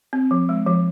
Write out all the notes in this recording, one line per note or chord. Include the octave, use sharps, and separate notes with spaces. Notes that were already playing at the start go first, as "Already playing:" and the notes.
C4
F3
G#3
F3